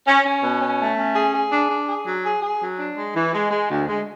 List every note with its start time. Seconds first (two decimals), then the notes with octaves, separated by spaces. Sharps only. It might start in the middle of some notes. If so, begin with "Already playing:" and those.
0.07 C#4
0.26 C#4
0.43 B2
0.62 C#4
0.79 A3
0.98 C#4
1.16 G#4
1.34 G#4
1.52 D4
1.70 D4
1.88 G#4
2.07 F#3
2.25 G#4
2.42 G#4
2.62 F#3
2.79 D4
2.97 G#3
3.16 E3
3.33 G#3
3.51 G#3
3.70 D2
3.88 G#3